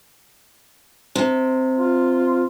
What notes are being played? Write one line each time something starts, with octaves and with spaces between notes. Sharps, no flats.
C3
F4